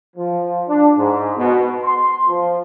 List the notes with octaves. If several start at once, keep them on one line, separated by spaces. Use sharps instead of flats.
F3
D4
G#2
B2
C6
F3